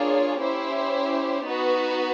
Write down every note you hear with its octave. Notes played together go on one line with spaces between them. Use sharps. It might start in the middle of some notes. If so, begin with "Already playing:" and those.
Already playing: A#3 D4 F4 G#4 C#5
C#4 E4 G4 C5
B3 D#4 F#4 B4